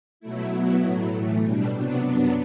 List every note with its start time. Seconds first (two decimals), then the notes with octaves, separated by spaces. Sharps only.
0.20 B2 F#3 A3 E4
0.50 B2 F#3 B3 E4
0.81 A2 F#3 A3
1.12 A2 E3 A3
1.43 B2 G3 D4
1.73 C3 F#3 B3 D4
2.04 F#2 F#3 B3 D4